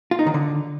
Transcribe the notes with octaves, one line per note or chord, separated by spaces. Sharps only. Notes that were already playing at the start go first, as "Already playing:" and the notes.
F4
D#4
D#3
D3